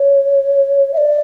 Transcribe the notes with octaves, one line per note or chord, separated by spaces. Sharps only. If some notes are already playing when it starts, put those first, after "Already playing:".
Already playing: C#5
E5
D5